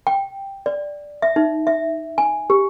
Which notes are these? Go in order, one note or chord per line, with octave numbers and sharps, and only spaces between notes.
G5
D5
E5
D#4
E5
G#5
G4